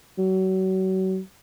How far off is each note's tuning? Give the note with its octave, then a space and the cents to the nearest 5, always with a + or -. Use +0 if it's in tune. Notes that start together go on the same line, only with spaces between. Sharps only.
F#3 +30